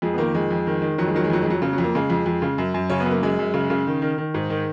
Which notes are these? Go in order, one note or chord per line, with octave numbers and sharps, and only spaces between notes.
F2 G#3
B3
D#3 A#3
F2 G#3
F2
D#3
D#3
F2 F#3
G#3
D#3 F#3
G#3
F2 F#3
G#3
F2 F#3
C#3 F#3
F#3
F2
A#3
C#3 G#3
F2
F2
C#3
F#2
F#2
C#3 C#4
B3
F#2
A#3
F#2 G#3
F#2
C#3
C#3
D#3
D#3
D#3
G#2
D#3